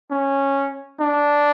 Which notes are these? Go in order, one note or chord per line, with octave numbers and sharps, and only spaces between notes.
C#4
D4